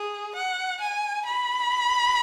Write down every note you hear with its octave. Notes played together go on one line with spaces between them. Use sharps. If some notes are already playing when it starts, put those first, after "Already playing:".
Already playing: G#4
F#5
G#5
B5